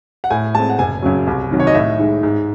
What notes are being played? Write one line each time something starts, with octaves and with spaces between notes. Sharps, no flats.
F#5
A2 G#5
G#3 C4 A5
F#5
F#1 G#5
F#2 C#3 F#3
C2
C3 D#3 F#3
C#5
D#5
A2 E5
G#3 D#4
G#2